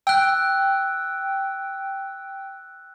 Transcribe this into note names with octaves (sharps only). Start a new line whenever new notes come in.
G5 E6 F#6